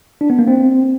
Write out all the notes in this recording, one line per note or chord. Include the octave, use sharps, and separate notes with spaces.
D4
B3
A#3
C4